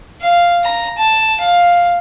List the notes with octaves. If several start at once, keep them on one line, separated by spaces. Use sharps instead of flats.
F5
A#5
A5
F5